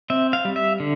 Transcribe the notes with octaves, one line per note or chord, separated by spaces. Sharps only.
C4 E5
F5
G3
E5
D3